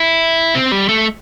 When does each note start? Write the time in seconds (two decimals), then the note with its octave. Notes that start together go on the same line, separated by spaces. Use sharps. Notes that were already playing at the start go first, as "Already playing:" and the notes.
Already playing: E4
0.55 C4
0.72 G3
0.89 A3